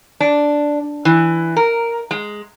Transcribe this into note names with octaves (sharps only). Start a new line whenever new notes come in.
D4
E3
A#4
G#3